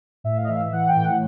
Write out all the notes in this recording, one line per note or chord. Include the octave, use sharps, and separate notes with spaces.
A2 E5
F5
D#5
E3 E5
F5
E5
E3 F#5
G5
A2
F#5